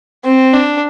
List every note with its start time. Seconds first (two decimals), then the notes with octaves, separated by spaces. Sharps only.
0.24 C4
0.53 D4